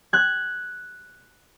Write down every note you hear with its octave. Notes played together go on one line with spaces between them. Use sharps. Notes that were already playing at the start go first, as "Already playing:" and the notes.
F#6 G#6